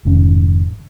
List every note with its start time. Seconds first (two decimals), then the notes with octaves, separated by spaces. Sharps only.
0.05 F1 G#2 D#3 C#4